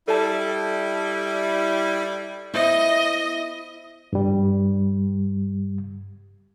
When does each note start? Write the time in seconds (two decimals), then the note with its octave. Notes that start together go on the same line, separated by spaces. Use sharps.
0.08 G3 E4 A4 A5
2.54 B3 E4 C5 D#5 E5
4.13 G2 G3